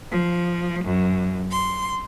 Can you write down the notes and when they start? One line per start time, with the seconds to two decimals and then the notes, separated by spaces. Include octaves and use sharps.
0.12 F3
0.85 F#2
1.51 C6